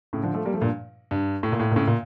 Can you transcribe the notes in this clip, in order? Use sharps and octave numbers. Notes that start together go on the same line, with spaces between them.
A2 C#3
D3 F3
F3 A3
G3 A#3
F3 A3
G2 A#2
G2
A2
A#2
A2
A#2
A2 C#3
A#2